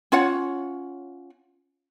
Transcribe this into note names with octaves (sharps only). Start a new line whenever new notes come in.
C#4 F4 C#5 F#5